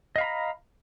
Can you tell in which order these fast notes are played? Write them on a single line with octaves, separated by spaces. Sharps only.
D#5 F5 B5 A#5